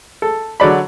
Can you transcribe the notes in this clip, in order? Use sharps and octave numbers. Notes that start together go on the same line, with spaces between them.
A4
D3 F#3 D5 B5